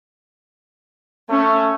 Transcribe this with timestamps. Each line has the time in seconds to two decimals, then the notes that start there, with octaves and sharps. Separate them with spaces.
1.29 A3 C#4